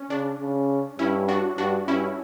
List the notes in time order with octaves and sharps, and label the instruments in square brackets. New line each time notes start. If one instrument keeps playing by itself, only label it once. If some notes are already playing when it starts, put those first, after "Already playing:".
Already playing: [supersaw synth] C#4
[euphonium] C#3 [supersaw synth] D4
[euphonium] C#3
[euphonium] G2 [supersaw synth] C#4 E4
[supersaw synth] D4 F#4
[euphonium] G2 [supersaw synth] D4 F#4
[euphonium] G2 [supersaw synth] C#4 E4